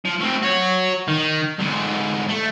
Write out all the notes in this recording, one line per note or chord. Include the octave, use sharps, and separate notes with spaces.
F3
A3 C4
F#4 C#5
D#3
G#2 D3
A3